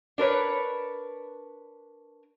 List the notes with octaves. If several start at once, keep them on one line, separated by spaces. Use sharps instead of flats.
D4 A#4 B4 C#5